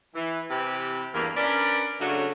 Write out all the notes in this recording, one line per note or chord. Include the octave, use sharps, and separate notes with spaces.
E3
C3 E3 C4 G4
E2 G2 E3 A#3
C#4 D4 A#4 B4 D5
C#3 F#3 A3 C#4 D4 F#4